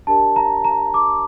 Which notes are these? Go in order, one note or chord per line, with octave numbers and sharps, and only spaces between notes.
D4 G4 A#4 D5 A5
A#5
A#5
D6